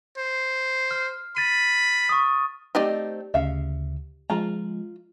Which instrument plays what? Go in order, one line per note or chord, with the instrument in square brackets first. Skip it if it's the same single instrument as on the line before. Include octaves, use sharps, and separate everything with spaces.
[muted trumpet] C5
[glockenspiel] F6
[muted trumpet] B5 [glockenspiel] A6 D#7
[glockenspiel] C#6 D#6
[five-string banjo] A3 C4 D#4 [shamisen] G4 D5 D#5
[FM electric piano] D2 C#3 [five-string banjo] E5 F5
[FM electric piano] F3 G#3 [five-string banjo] F4 A#5